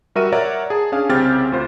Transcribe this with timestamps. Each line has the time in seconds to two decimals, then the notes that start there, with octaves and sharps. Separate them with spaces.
0.15 G3 F#4 A#4 E5 C#6 D#7
0.32 A#4 C#5 D5 E5 F#5 A#5
0.70 G#4 A5
0.92 C#4 D4 G#4 F5
1.09 C2 C#3 C4 G4 F6 A6
1.52 D2 F4 C5